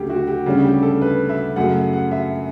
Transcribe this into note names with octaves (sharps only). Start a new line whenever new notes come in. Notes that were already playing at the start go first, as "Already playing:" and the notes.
Already playing: D2 C#3 F#3 A3 G4
F#4
G4
D2 C#3 G3 C#4
G4
A4
B4
E5
F#2 C#3 F#3 A3 F#5
F#5
E5